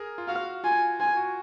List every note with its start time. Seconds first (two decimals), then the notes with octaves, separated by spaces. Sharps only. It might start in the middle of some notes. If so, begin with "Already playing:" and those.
Already playing: G#4 A#4
0.18 F4
0.28 F#4 F5
0.64 F4 G#5
1.00 F4 G#5
1.17 F#4